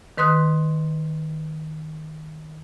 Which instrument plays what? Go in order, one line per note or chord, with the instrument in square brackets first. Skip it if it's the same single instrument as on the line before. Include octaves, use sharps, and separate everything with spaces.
[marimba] D#3 B4 C6 D#6 F#6